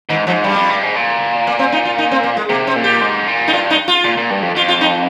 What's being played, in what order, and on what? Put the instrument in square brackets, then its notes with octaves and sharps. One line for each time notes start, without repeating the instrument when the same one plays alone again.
[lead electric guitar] G#2 [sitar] D#3
[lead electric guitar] G#2 [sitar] F3
[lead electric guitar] G2 [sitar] G3
[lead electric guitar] F2
G2
G#2
A#2
[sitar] A#3
C4
D#4
F4
D#4
C4
A#3
G#3
[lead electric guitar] C3 [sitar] A#3
[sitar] C4
[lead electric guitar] A#2
[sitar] G4
[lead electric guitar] G#2
A#2
[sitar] D#4
[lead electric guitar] G2 [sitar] F4
[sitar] D#4
F4
[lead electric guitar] A#2
A#2
G2
F2
[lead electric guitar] F2 [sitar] F4
[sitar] F4
D#4